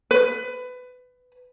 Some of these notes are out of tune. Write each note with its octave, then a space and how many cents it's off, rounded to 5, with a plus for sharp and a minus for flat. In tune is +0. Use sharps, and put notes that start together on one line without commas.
B4 +20